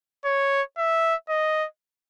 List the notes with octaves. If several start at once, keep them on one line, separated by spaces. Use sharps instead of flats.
C#5
E5
D#5